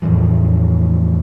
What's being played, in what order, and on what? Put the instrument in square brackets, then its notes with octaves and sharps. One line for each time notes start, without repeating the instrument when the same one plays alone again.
[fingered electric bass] E2 A2 E3 F3